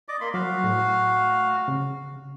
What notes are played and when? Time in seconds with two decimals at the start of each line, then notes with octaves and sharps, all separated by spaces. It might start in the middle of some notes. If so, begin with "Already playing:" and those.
0.08 D5 D#5 D6
0.20 A#3 B5 C6
0.34 F#3 F#4 F5
0.64 A2
1.68 C#3